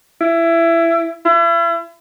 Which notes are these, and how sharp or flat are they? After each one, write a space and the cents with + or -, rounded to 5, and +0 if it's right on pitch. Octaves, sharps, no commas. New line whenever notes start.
E4 +20
E4 +40